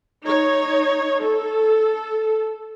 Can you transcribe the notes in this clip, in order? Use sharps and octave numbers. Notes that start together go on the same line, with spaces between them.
D#4 C#5
A4